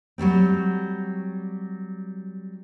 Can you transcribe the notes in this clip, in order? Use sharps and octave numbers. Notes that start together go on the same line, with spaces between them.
F#3 G3 A3 C4